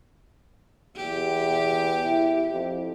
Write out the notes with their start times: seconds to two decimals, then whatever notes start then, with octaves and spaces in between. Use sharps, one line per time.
0.96 E2 G4
2.04 E4
2.52 F2